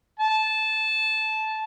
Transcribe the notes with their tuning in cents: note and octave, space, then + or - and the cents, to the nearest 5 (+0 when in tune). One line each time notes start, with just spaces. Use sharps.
A5 -15